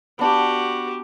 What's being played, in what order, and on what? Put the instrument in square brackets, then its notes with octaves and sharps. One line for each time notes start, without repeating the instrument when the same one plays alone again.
[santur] B3 D4 F#5 [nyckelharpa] F#4 G4